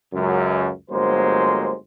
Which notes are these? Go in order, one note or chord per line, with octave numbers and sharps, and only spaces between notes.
C#2 F#2
G1 F#3 G#3 A#3 C5